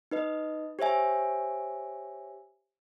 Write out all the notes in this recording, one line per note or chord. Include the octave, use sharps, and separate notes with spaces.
D#4 B4 D#5
G4 C5 C#5 E5 G#5